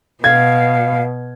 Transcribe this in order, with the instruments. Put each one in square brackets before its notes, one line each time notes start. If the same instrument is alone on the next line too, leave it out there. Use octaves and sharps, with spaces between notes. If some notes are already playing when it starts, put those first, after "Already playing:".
[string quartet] B2 [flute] F5 [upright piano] G#6